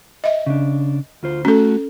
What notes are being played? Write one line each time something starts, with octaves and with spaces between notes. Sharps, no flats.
D#5 E5
C#3 D4
D2 F4 C5
A3 C#4 F#4 A4